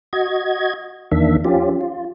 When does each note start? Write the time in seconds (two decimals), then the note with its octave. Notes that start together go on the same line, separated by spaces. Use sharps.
0.13 F#4 D#5 G#6
1.12 E2 D#3 A#3 D4 E5
1.45 F3 C#4 F4 G4
1.81 F4